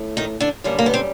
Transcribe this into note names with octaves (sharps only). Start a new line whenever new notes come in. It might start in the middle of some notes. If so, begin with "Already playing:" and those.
Already playing: A2 A3
D#3 D#4
D3 D4
F#2 D3 G3 A#3
A#3
B3
C4